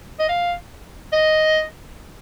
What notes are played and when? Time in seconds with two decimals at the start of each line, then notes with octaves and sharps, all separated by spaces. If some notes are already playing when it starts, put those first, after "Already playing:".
0.19 D#5
0.29 F5
1.12 D#5